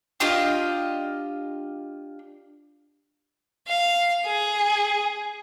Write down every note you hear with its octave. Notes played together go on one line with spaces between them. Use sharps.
D4 F4 G4 D#5
F5
G#4